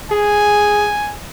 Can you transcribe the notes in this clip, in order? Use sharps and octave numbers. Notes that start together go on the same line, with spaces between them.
G#4 G#5